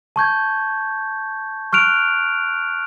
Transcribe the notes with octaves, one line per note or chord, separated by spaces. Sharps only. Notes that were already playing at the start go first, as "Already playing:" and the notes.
A5 C#6 G6 G#6
C#6 F6 F#6 D7 F7